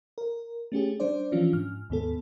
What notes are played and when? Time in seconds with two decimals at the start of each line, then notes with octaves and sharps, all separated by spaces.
0.18 A#4
0.72 A3 C#4 G4 G#4
1.00 G3 D4 C5 D5
1.32 E3 F3 C#4 D4 F4
1.53 G#2 F6
1.90 D#2 G#2 B3 A4